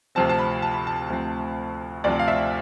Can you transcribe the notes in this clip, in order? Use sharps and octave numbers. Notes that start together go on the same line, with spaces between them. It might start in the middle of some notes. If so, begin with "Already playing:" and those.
D2 C3 F3 C4 A5
A5
B5
A5
B5
A5
D2 C3 F3 C4
D2 C3 F3 C4 D5
F5
E5